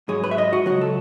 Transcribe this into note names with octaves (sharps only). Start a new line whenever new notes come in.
G#2 F#3 G#4
B4
E5
D#5
F#4
C#2 B2 F#3 F#4
A4